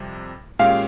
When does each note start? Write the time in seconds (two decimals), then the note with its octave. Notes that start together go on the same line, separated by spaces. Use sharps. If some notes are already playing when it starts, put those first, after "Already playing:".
Already playing: F2 C3 G3
0.59 A#2 G#3 C#4 G4 F5